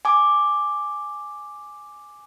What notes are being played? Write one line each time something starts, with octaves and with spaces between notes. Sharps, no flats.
G#5 D6